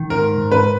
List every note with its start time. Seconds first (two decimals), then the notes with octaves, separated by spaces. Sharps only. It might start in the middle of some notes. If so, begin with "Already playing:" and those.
Already playing: D#3
0.10 G#2 A#4
0.37 G#2
0.52 B4